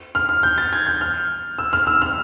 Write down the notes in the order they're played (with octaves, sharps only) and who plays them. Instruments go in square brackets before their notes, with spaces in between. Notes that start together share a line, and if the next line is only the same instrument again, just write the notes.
[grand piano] F6
F6
G6
A6
G#6
G6
F6
E6
F6
E6
F6